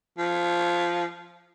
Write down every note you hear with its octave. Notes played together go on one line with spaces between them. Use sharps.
F3